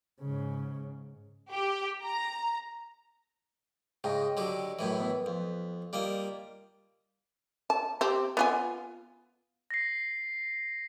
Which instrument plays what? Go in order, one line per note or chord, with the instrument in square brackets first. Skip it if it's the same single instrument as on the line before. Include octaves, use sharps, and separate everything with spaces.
[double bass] G#2 C#3
[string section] G4
A#5
[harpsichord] G#2 C#3 [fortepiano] D#5 G5
[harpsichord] D3 F#3 G4
F#2 A2 E3
[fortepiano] B3
[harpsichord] F2
[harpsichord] G3 A#3 D#5 [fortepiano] F4
[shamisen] A5
C4 G4
B3 F4 G#5
[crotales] A#6 C7